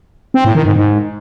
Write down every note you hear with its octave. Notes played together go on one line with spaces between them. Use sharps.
C4
A2
D#3
G#2
G#2